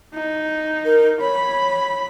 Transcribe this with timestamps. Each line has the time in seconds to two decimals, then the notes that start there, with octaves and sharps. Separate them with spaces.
0.14 D#4
0.85 A#4
1.20 C#5 B5